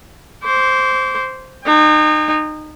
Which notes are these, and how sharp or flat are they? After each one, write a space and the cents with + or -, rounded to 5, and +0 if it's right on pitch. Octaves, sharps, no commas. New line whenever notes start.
C5 +0 D6 -40
D#4 -30 G5 +35